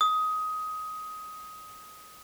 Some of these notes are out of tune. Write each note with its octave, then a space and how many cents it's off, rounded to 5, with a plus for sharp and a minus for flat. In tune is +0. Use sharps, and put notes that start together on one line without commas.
D#6 +15